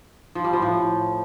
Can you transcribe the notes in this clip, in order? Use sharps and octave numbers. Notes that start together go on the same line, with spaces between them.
F3
G3
F3
A2